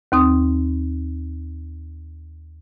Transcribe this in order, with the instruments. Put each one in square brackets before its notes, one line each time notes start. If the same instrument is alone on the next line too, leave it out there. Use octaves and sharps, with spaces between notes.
[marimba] D#2 C4 D#6